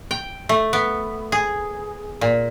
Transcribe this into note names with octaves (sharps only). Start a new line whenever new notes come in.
G5
A3
B3
G#4
A#2